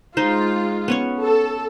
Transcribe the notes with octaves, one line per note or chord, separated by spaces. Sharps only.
G#3 D#4 F4 C5
B3 C#4 C#5
A4